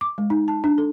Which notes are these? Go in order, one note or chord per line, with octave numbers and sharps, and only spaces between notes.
D6
G#3
D#4
A5
D4
A4